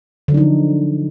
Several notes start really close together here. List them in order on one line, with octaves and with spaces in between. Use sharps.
D3 F#3 D4 D#4 F3